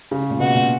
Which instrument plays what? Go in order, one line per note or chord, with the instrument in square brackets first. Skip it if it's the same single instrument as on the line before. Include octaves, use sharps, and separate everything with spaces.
[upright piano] C#3
A#2
[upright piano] B2 [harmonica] F#4
[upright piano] A#2